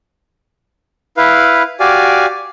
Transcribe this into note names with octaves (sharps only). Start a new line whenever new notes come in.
E4 B4 F5
F#4 G4 D5 F5 G#5